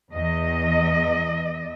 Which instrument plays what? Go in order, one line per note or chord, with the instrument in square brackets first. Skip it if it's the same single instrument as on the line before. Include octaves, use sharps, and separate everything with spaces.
[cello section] E2 D#5